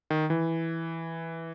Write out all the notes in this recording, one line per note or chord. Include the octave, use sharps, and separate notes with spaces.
D#3
E3